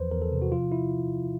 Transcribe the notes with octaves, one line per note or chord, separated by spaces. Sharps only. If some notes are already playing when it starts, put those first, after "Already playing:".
Already playing: E2 E3 F3 B4 C5
E2 A#4
A4
C3
F#4
F3 F4
E4